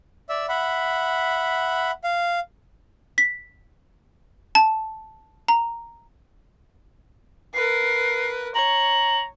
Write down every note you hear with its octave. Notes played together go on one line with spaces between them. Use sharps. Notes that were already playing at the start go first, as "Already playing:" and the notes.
D5 E5 E6
E5 F#5 B5
F5
B6
A5
A#5
A#4 B4 C7
C#5 A#5 F#7